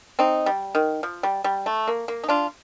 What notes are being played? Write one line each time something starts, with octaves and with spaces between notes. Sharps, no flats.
C4 D#4
G3
D#3
F3
G3
G3
A3
A#3
A#3
D#4
D4 F4